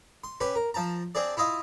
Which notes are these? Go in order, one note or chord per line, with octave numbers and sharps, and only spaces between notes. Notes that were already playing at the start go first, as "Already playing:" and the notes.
C6
C#4 G4 B4
A#4
F3 A5 A#5
C4 D4 G#4 D5
E4 F4 D#5 F5